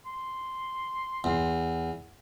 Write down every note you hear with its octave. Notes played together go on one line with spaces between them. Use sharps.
C6
E2